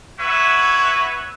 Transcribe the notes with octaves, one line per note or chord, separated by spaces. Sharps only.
E4 F#4 B4 C#5 E5